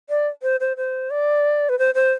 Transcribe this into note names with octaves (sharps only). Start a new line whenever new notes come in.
D5
C5
C5
C5
D5
B4
C5
C5